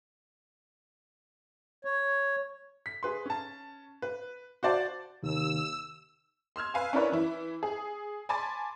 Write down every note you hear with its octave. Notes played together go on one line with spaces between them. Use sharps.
C#5
B6
G#4 B4 C6
C#4 A5
B4
F#4 C5 D5 A5
D#2 C3 D#3 A#3 E6
C6 E6 F6 G#6
B4 F5 G#5
C#4 D4 E4 A#4 B4 C#5
E3 E4
G#4
G#5 A5 B5 C6 D6 A6